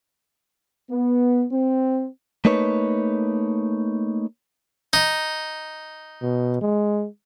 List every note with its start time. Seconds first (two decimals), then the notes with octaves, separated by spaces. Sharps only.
0.90 B3
1.52 C4
2.45 A3 A#3 D#4 B4 C#5
4.93 D#4
6.22 B2
6.62 G#3